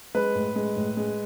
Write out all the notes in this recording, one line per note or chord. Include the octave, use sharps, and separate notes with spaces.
G#3 B4
A2
G#3
A2
G#3